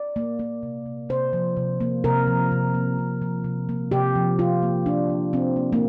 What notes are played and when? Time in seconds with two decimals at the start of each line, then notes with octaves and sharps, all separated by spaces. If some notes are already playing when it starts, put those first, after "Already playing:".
Already playing: D5
0.16 A#3
0.39 A#3
0.63 C3
0.86 C3
1.09 C3 C5
1.33 F3
1.57 C3
1.80 A#3
2.04 C3 A#4
2.27 F3
2.52 C3
2.74 A#3
2.99 C3
3.22 F3
3.44 C3
3.69 A#3
3.92 C3 G4
4.15 F3
4.39 C3 F4
4.63 A#3
4.86 C3 D4
5.10 F3
5.33 C3 C4
5.56 A#3
5.73 A#3